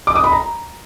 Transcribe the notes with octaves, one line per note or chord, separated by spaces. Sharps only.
D6
D#6
B5
A#5